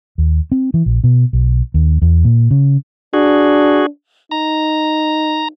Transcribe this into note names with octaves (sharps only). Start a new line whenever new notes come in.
D#2
C4
E3
A#1
B2
B1
D#2
E2
A#2
C#3
D4 F#4 G#4
D#4 A#5